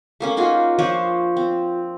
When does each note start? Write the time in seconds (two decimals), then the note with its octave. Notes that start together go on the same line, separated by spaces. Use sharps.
0.20 A3 A#3 C#4
0.37 D#4 F4 F#4 G#4
0.78 F3 D4 C5 C#5
1.37 C4